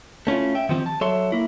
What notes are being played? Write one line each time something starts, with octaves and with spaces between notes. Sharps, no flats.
A3 C#4 E4 F4
E5 G5
D#3 F3 C4 G4
A5
F#3 A4 C#5 E5 C6
A#3 E4